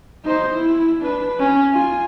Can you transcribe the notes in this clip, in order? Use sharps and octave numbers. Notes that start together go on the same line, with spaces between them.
D#4 C5
E4
D4 B4
C#4
F4 G#5